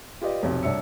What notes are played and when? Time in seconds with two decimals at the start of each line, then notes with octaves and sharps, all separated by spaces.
0.21 F4 G4 B4 D5 D#5
0.43 B1 F2 C3
0.63 C2 D4 C#5 E5 E6 C#7